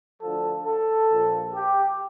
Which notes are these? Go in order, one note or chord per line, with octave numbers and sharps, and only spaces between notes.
D2 D3 F3 A4
A4
A#1 A#2 F3
G4